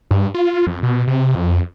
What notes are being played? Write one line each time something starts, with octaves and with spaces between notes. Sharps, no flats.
G2
F4
F2
B2
C3
F2